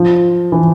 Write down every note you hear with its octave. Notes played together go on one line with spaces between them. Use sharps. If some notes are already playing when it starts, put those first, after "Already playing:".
Already playing: F3
E3